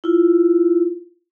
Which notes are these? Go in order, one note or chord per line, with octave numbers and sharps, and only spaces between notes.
E4 F4